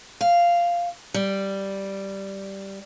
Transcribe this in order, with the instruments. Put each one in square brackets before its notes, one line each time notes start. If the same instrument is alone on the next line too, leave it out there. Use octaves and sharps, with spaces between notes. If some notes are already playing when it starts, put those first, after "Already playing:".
[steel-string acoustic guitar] F5
G3